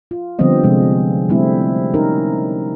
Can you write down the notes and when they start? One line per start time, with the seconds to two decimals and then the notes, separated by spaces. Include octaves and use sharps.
0.11 F4
0.39 D3 F3 G3 B3 C4 D#5
0.64 C3 F3 G#3
1.29 G3 A3 C4 E4
1.94 C#4 D#4 A#4